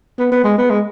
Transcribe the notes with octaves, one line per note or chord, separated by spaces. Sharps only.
B3
B3
G#3
B3
G#3